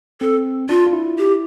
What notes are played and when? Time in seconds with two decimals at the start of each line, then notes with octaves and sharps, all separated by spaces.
0.21 C4 A4
0.69 D4 F4
0.86 F4
0.93 E4
1.18 G4